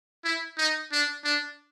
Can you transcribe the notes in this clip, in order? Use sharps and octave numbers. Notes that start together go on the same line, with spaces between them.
E4
D#4
D4
D4